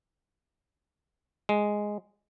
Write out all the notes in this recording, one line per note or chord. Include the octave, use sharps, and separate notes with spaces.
G#3